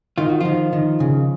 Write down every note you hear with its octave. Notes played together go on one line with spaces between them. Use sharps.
D#3 F4
F#4
D#3 F3 F4
D#3
C#3